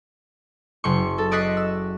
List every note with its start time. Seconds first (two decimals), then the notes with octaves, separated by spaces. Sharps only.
0.84 F#1 C6 C#6
1.18 A4
1.31 D5 D#5 C#6 F#6 B6 C7
1.57 E6